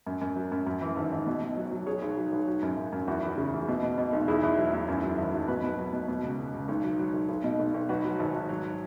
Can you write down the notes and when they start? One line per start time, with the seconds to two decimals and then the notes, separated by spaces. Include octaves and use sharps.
0.06 F#2
0.21 F#2
0.36 F#3
0.52 F#2
0.66 F#2
0.81 E3
0.96 G#1
1.12 G#1
1.27 B2
1.42 B2
1.56 F#3
1.71 F#3
1.87 F#3 G#4 C#5
2.02 B1
2.17 F#3
2.32 B1
2.47 F#3
2.63 F#2
2.77 F#2
2.92 F#2
3.07 E2 F#4
3.23 E2
3.37 C#3
3.53 E3
3.68 B2
3.83 B2
3.98 B2
4.13 B1
4.28 E2 E4 G#4
4.43 E2
4.58 F#3
4.73 E2
4.88 F#2
5.03 F#3
5.18 G#1
5.34 F#3
5.48 B2 F#4 B4
5.63 B2
5.78 F#3
5.93 B2
6.08 B2
6.24 C#2
6.39 C#2
6.53 C#2
6.68 B1
6.83 F#3
6.99 F#3
7.14 B1
7.29 B1
7.44 B2
7.59 B1
7.74 B1
7.89 F#3 F#4 B4
8.04 F#3
8.19 G#1
8.35 G#1
8.49 F#3